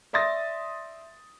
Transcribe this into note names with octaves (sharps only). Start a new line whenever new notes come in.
D5 E5 C6 D#6 A6 A#6